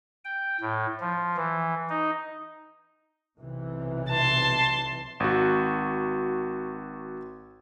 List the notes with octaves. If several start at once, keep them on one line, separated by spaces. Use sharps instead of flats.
G5
A2
F3
E3
D#4
B1 C3 E3
A5 C6
G#1 F#4